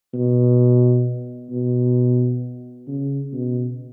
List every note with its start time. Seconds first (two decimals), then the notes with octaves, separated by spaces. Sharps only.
0.14 B2
1.51 B2
2.87 C#3
3.33 B2